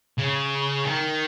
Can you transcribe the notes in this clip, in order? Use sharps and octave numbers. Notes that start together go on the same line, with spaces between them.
C#3
D#3